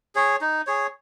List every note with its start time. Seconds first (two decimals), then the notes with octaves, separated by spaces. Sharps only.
0.15 G#4 C#5
0.41 D#4
0.67 G#4 C#5